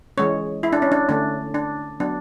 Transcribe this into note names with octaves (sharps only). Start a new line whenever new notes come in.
E3 G#3 C#4 C#5
E4
D4
C#4
D4
D3 A3 C#4 D4
D4
F#3 B3 D4